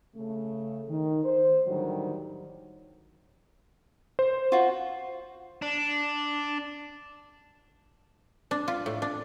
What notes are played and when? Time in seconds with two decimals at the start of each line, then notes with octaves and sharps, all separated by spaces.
0.16 C#3 A3
0.89 D#3
1.24 C5
1.67 A2 D3 D#3 F#3 G3
4.19 C5
4.52 F4 F#4
5.62 D4
8.51 D4
8.68 F4
8.86 A2
9.02 D4